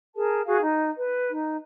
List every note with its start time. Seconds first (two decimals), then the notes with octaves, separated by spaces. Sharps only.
0.16 G#4 A#4 A5
0.47 F#4 G#4 F5
0.62 D#4
0.97 B4
1.32 D#4